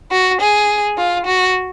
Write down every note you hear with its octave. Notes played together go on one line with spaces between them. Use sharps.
F#4
G#4
F4
F#4